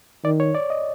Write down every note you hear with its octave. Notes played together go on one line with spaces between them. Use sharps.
D#3 D5
C#5
D5
D#5